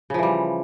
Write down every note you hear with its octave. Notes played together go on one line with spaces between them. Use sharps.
C#3 E3 F3 G3